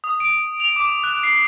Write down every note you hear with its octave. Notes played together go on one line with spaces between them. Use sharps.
D#6
D7
F7
D6
F#6
C7